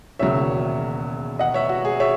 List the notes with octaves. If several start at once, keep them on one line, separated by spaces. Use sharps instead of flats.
E1 D#2 C#3 F#3 C#5 E5
D#5 F#5
C#5 E5
F#4
G#4
C#5 E5